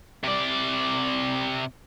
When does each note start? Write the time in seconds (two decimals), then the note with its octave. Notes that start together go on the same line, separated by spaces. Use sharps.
0.24 C3 D5